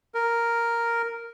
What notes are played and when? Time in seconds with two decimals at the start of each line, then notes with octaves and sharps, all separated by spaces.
0.14 A#4